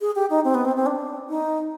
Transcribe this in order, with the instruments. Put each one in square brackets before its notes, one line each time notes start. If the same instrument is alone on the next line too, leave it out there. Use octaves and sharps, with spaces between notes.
[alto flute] G#4
G4
D#4
C4
B3
C4
C4
D4
D#4